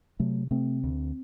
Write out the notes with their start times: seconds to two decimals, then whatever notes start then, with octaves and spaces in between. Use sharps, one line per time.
0.20 C3 F#3 A3
0.51 C3 A3 C4
0.84 D2